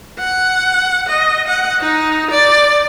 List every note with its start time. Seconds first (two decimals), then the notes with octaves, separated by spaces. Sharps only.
0.19 F#5
1.08 D#5
1.48 F#5
1.81 D#4
2.31 D5